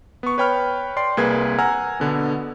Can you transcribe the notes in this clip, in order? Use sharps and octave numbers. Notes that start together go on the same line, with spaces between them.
B3 C#6
B4 C#5 G5 B5 F6
D5 G5 C6 C7
C2 A#3 G#4 B4 G#6
F#5 G#5 A#5 E6 F6
B2 D3 B3